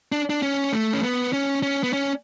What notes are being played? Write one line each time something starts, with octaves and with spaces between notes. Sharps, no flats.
D4
D4
C#4
A3
C#4
B3
C#4
C#4
B3
C#4